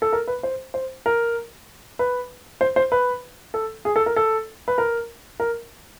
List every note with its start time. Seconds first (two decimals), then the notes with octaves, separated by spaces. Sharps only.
0.02 A4
0.13 A#4
0.28 B4
0.43 C5
0.74 C5
1.06 A#4
1.99 B4
2.61 C5
2.76 C5
2.92 B4
3.54 A4
3.85 G#4
3.96 A4
4.06 A#4
4.16 A4
4.68 B4
4.78 A#4
5.40 A#4